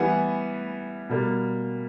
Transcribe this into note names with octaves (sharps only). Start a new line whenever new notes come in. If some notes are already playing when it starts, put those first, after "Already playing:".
Already playing: E3 G3 B3 F#5 G#5
B2 G3 A#3